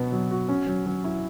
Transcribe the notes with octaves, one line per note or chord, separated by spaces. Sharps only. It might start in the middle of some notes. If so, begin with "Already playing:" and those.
Already playing: B2 F#3 B3 F#4
F#3
F#4
C#4
F#3
F#3
E4